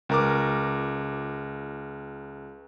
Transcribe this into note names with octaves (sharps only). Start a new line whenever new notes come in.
C#2 A#4 D6